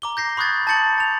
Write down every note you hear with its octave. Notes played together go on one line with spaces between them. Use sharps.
A#5 D6 G7
G6 A#6 C7
B5 C#6 D#6 F#6 G#6 A6
A5 B5 G6 A6 C#7 F#7
A5 F7